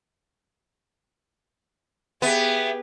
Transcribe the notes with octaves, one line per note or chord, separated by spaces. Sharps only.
B3 G4 G#4 E5